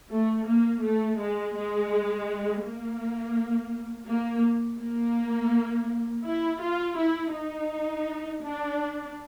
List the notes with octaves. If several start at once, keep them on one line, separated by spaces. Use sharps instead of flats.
A3
A#3
A3
G#3
G#3
A#3
A#3
A#3
E4
F4
E4
D#4
D4